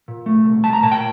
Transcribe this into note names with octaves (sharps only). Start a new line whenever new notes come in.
A#2
A3
C2
C2 A5
A#5
A#2 A5
G5